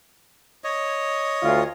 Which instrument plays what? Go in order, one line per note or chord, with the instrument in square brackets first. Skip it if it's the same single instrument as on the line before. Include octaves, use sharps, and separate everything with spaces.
[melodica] C#5 D#5
[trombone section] D2 F4